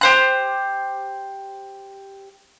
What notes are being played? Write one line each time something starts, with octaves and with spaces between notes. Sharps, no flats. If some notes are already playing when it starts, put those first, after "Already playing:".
G4 C5 F#6